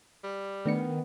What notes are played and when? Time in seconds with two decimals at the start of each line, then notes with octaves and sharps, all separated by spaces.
0.23 G3
0.65 D#3 A3 B3 D4 C#7